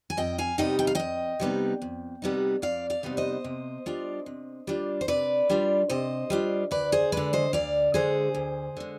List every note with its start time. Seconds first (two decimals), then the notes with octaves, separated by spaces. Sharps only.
0.10 G#5
0.17 F2 D#5 G5
0.38 F5 G#5
0.58 C3 G3 B3 D#4 D#5 G5
0.79 G5
0.87 F5
0.95 F2 D#5 G5
1.40 C3 G3 B3 D#4
1.82 F2
2.22 C3 G3 B3 D#4
2.62 F2 D5 F5
2.90 D5 F5
3.03 C3 G3 B3 D#4
3.17 C5 D#5
3.44 C3
3.86 G3 D4 F4
4.26 C3
4.67 G3 D4 F4
5.01 C5
5.08 C3 B4 D5
5.50 G3 D4 F4
5.90 C3 C5 D#5
6.30 G3 D4 F4
6.71 D2 B4 D5
6.92 G#4 C5
7.12 D3 G#3 B4 D5
7.33 C5 D#5
7.53 D2 D5 F5
7.94 D3 G#3 G#4 C5
8.34 D2
8.77 D3 G#3